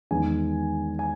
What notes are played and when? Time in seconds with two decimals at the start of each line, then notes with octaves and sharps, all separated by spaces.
0.11 E2 D#3 G#3 B3 G#5
0.99 G#5